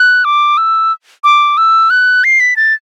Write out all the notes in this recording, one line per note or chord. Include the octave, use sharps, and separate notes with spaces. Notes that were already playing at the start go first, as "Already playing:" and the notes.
Already playing: F#6
D6
E6
D6
E6
F#6
C7
B6
A6